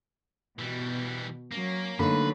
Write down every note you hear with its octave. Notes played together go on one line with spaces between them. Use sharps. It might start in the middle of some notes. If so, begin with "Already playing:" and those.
B2 E3 G3
F#3 A#3 C#4
D3 F#3 A3 A#3 D#4 B4 B5